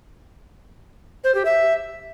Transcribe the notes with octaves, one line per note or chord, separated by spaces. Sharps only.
C5
G4
E5